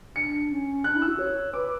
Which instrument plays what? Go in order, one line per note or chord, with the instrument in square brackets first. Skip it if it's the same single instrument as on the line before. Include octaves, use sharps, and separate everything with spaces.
[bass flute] D4 [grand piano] C#7
[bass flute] C#4
[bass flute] D4 [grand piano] F#6
[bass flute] E4
[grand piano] E6
[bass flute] F#4
C#5
[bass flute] B4 [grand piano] D6